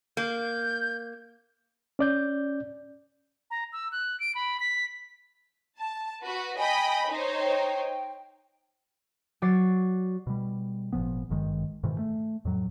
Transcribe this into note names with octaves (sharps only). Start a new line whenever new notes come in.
A#3 G6
C#4 D5 G6
A#5
E6
F#6
D7
B5
B6
A5
F#4 B4
D#5 G5 G#5 B5
D#4 C5 C#5
G5
F#3 F#4 D5 D6 A6 C7
B2 G3
G#1 A#2 F3 B3
G#1 G2 D#3 G#3
G#2 B2 D#3 E3
A3
F2 A2 F#3